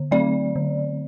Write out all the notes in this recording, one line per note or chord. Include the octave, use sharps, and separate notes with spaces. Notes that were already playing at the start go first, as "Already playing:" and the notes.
Already playing: D3
F#3 A3 C4 D5
D3